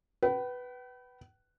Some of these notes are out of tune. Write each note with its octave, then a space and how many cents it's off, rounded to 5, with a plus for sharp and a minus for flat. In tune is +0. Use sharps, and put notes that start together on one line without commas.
B4 +0 G5 -45